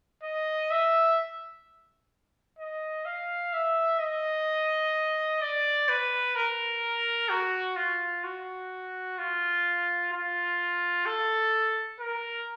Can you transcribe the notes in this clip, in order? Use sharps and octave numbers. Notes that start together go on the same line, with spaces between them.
D#5
E5
D#5
F5
E5
D#5
D5
B4
A#4
F#4
F4
F#4
F4
F4
A4
A#4